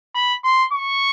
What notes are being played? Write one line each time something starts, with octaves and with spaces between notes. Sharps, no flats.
B5
C6
C#6